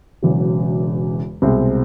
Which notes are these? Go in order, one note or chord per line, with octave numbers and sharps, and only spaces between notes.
E1 E2 C#3 F#3
C2 B2 G#3 C4